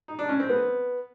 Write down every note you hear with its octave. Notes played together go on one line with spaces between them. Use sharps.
D#4
D4
C#4
C4
B3